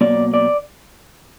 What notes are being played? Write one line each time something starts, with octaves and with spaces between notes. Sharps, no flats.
B2 F#3 A#3 D5
D5